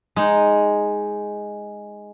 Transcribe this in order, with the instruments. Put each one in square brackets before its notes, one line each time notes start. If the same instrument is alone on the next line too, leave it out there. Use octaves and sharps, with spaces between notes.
[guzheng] G#3 D#4